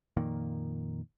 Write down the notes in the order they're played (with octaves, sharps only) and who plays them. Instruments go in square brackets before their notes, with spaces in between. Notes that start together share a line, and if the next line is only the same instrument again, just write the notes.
[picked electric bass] F2 A#2 D#3 A#3